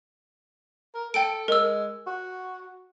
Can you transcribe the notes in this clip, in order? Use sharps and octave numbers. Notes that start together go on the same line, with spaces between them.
A#4
A4 G5 D7
G#3 A#4 E6
F#4